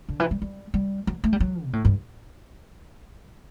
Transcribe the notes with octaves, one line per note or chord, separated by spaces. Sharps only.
D3
E3
G3
G3
G3
F#3
A3
G3
F#3
B2
A2
G2